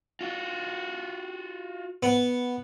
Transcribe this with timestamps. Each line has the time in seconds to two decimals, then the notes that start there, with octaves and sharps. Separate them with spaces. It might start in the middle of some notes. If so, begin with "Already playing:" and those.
0.21 F4 F#4
2.03 B3